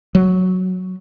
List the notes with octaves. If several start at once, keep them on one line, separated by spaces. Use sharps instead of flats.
F#3